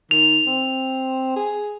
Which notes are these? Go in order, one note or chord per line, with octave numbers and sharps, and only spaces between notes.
D#3 F7
C4
G#4